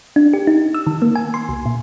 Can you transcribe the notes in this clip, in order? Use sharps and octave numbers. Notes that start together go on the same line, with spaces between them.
D4
G4
D#4
E6
D#3
A#3
G#5
C6
C2
A#2